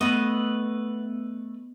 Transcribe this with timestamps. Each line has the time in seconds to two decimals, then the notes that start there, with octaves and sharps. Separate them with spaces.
0.01 A3 B3 B4 D#5